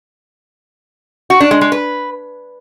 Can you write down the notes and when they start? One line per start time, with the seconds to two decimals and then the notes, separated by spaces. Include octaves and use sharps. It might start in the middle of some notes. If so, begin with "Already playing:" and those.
1.30 F#4
1.40 D4
1.51 G#3
1.61 G#3
1.72 B4